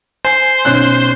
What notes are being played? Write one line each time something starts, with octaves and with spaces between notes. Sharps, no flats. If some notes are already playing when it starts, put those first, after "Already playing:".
C5 G#5 C6
B1 C#4 F#6